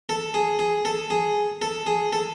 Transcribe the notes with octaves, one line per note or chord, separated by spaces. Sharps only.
A4
G#4
G#4
A4
G#4
A4
G#4
A4